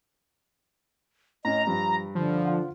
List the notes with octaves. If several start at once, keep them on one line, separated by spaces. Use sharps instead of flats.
A2 C#4 D#5 A#5
G2 F3
D3 F3
F4 F#5